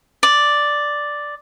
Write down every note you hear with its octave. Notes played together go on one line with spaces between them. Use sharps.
D5